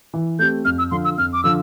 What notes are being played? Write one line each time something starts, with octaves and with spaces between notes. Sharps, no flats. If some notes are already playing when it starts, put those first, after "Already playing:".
E3
A3 C4 G4 G6
F2 F6
E6
D3 F3 C6
E6
F2 F6
D6
D3 F3 E6